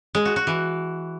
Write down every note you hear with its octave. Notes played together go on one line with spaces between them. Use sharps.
G#3
F#4
F#4
E3